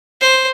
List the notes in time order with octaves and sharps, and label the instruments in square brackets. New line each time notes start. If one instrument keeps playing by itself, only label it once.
[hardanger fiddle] C5